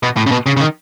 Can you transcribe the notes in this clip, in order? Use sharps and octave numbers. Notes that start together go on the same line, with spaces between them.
B2
A2
C#3
B2
C#3
C#3
D#3